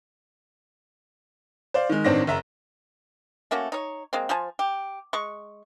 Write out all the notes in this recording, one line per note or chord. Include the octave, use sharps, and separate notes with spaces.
C5 D5 F5
D#3 G#3
A1 D#3 C4 D4 A#6
F#1 E5 A#5
A3 A#3 C#4 F#4
D#4 C#5
G#3 A#3 C4
F3 C5 G#5 A5
G4
G#3 C#6